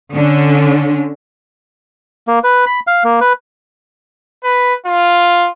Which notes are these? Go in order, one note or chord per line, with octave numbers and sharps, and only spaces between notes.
D3 C#4 D4
A#3
B4
B5
F5
A#3
B4
B4
F4